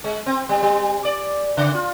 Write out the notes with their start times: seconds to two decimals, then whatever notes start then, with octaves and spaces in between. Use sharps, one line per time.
0.04 G#3
0.26 C4
0.49 G3
0.62 G3
1.05 D5
1.57 C#3
1.75 F4